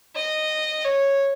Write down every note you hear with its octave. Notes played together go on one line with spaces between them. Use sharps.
D#5
C#5